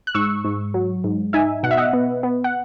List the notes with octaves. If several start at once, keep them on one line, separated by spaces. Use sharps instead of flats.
F#6
G#2 C#6 E6
G#2
F#3
G#2
D#4 E5 G#5
B2 F#5
E5
D#5 F#5
B3
B3
F#5